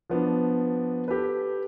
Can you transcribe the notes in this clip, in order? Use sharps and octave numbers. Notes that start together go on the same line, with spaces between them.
F3 B3 D4
G4 A4 B4